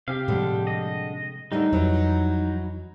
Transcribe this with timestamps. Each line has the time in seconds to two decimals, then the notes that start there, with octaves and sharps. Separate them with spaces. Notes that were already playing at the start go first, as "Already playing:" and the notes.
0.08 C3 G4 F5
0.28 A2 D3 F3 G3 G#3
0.67 D#5
1.52 A2 D3 D#3 G3 D#4
1.73 F2 E3 F#3